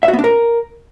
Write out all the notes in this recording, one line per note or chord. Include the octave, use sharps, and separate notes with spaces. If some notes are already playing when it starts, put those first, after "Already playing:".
E5
F#4
B3
D4
A#4